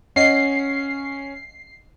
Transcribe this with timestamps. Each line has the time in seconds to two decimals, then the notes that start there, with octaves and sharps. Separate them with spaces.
0.16 C#4 D#5 F5 F#5 C7